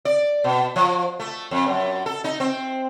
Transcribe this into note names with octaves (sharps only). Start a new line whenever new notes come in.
D5
B2
F3
A3
F2
F#2
A4
D#4
C4